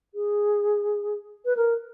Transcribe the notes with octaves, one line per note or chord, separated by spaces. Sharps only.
G#4
B4
A#4